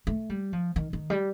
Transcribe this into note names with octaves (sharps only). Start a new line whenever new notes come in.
A3
G3
F3
D#3
D#3
G3